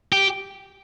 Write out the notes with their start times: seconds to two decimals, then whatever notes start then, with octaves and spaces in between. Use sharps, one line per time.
0.13 G4